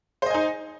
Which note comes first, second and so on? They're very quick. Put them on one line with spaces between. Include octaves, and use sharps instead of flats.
C5 D#5 G#5 D#4